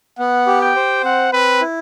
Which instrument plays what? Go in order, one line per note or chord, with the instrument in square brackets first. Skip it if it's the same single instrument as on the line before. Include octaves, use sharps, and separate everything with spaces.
[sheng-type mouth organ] B3 [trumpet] F#5
[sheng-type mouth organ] G4
[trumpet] G5
[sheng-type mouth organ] C5
[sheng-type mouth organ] C4 [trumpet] F#5
[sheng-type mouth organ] C4 [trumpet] B4
[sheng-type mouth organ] E4